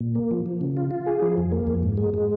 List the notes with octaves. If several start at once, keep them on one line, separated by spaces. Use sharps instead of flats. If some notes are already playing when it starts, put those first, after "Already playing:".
A#2
A#3
F3
F3
C#3
F4
F4
G#4
F3
F2
A#3
F2
G#2
G#3
G#3